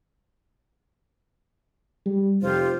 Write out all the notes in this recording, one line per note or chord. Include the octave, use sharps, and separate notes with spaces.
G3
F1 F4 G4 C5